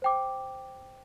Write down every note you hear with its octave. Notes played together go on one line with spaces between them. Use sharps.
C5 G5 D6